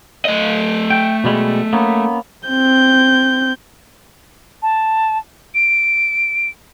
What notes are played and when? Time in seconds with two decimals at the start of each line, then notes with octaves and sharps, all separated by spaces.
0.25 A3 D#5
0.90 G5
1.24 B2 G3 G#3
1.73 A#3 B3 C#4
2.49 C4 G6
4.62 A5
5.55 D7